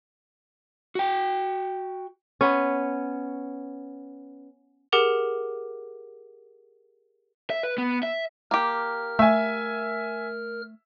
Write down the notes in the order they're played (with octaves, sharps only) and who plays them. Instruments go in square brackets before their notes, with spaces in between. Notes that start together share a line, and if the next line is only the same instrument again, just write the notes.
[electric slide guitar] F#4 G5
[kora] B3 C#4
[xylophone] G4 G#4 A#4 F#5 D6 F7
[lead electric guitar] E5
B4
B3
E5
[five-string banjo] A#3 G4 [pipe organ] A#4 F6
[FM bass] A3 [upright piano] E5 G#5